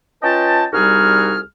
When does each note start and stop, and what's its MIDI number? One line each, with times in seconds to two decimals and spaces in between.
0.23 0.65 61
0.23 0.65 65
0.23 0.65 71
0.23 0.65 75
0.23 0.65 79
0.23 0.65 81
0.73 1.40 36
0.73 1.40 55
0.73 1.40 63
0.73 1.40 66
0.73 1.40 68
0.73 1.40 89